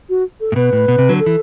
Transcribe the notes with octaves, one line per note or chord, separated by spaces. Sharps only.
F#4
A4
A2
B2 B4
A2
B2
C3
D3 F#3
A4
E3